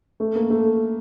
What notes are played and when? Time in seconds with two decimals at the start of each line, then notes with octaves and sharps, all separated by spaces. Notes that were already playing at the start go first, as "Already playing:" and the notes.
0.20 A3
0.35 A#3
0.50 A3